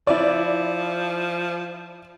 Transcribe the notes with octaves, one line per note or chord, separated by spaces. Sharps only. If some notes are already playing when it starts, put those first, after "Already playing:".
F3 E4 D5